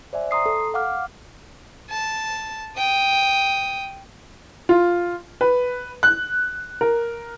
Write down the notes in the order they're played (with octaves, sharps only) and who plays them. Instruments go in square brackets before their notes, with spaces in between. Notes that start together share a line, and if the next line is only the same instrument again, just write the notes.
[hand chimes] C5 D5 E5 G#5
A#5 C6 D#6 C7
A4
F5 F#5 D6 F6
[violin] A5
G5 D#6
[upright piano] F4
B4
F#6
A#4